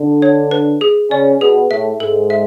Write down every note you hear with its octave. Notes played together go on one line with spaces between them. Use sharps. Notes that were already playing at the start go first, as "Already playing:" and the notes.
Already playing: D3 D4
C#5
B4
G#4
C#3 C#4 D5
B2 B3 G#4
A2 A3 E5
G#2 G#3 A4
E5